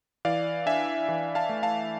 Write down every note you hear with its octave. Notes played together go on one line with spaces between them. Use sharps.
E3 D5 F5
D4 E5 G#5
E3
F5 A5
A3
F5 A5